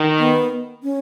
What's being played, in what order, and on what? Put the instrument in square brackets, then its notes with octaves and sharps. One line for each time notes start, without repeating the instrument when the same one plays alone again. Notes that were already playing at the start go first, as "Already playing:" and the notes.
Already playing: [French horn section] D#3
[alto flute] B3
C#4